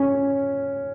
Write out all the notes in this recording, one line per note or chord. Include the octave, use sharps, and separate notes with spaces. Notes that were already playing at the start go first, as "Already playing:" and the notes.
Already playing: C#4